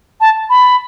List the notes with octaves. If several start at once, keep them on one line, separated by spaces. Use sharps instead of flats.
A5
B5